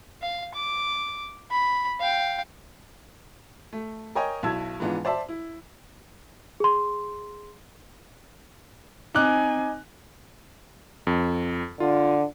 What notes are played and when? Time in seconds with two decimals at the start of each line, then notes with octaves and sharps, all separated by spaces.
0.22 F5
0.54 D6
1.51 B5
2.00 F5 G5
3.73 A3
4.15 A#4 C#5 D#5 G5 G#5
4.43 B1 B2 E4 A5 E6 G#6
4.80 G#2 E3 F3 B3 D4 F4
5.05 C5 D5 E5 A5
5.29 E4
6.60 G#4 C6
9.15 C4 D#4 G#5 D6 F#6
11.07 F2
11.80 D3 F4